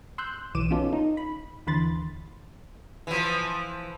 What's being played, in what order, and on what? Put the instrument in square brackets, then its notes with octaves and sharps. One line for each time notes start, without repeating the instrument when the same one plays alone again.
[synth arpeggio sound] C6 E6 F#6 G6
B1 E3 D6 D#7 E7
B3 C#4 D#4 F4 A4
D#4
B5
D#2 D3 E3 B5 C6 A6
[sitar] E3 F3